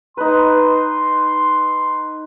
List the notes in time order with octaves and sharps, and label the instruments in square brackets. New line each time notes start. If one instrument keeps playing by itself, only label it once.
[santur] D#4 B4 [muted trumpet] C6